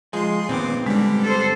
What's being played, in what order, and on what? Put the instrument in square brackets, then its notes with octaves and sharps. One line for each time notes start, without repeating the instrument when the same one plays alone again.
[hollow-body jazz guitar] F3 G#3 [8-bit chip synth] G#4 C6
[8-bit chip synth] A#2 D#3 D6 [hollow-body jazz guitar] B3 C4
[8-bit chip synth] D3 G3 [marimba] G#3
[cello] A4 C5